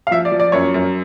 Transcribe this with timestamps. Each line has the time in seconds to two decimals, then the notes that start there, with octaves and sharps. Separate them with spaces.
0.07 F5
0.11 F3 E5
0.25 D5
0.32 F3
0.40 D5
0.52 F#2 C#5
0.74 F#2